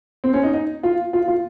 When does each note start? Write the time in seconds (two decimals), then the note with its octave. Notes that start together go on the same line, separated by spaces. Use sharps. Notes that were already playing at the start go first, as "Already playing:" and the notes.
0.24 C4
0.34 C#4
0.43 D#4
0.54 D#4
0.83 F4
1.13 F4
1.28 F4